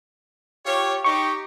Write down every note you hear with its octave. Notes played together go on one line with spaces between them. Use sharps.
F4 G4 C#5
D#4 G4 C#6